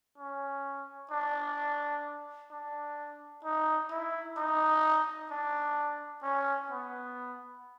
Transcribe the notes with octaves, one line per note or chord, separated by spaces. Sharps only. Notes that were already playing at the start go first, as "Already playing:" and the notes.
C#4
D4
D4
D#4
E4
D#4
D4
C#4
B3